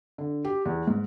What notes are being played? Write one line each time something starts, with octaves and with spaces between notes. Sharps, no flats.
D3
G4
E2
G#2